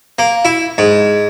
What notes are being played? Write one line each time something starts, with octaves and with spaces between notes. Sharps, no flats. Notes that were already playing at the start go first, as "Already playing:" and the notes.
A#3
E4
G#2